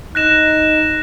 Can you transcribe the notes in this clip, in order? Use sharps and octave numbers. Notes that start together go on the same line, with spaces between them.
D#4 F#6 A#6 E7